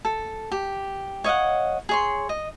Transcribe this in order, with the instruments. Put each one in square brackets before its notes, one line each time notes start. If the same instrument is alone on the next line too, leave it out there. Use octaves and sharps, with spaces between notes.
[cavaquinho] A4
G4
C#5 D#5 F5 F#5
G#4 C#5 C6
D#5